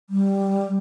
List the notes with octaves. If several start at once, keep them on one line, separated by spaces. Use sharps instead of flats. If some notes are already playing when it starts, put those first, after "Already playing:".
G3